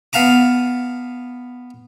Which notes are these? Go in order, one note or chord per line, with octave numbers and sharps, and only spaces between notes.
B3 F5 A5 A#5 D6